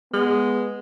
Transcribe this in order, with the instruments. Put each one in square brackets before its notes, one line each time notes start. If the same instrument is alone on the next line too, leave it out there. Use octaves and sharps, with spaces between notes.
[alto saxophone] G#3 [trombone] B3